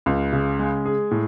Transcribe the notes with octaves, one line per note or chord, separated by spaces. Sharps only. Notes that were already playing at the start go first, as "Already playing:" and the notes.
C#2
C#3
G#3
G#4
A2